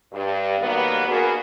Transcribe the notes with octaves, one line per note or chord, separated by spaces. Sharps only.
G2
D#3 F#3 G3 A#3 B3
A#3 B3 D4 F#4 G#4 A#4